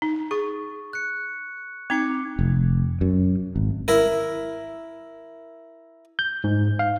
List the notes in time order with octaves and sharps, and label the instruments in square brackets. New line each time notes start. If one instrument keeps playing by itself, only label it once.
[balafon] D#4
[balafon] G#4 [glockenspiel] C#6 A6
[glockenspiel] F#6 C#7
[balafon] C4 D#4 [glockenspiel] D6 G#6 C#7
[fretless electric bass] F1
F#2
G#1
[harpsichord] E4 A#4
[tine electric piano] G6
G#2
F5